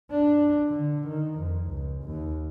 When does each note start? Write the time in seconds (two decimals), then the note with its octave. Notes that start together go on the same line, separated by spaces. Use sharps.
0.10 D4
0.68 D3
1.07 D#3
1.39 F2
1.68 C#2
2.04 D#2